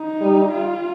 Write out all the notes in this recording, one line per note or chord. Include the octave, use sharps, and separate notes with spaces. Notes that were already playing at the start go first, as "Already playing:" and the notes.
Already playing: D#4
G3
F4